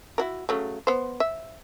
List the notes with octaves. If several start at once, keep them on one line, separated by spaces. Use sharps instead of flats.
E4 F#4 A#4
C#3 F#3 A3
B3 C5
E5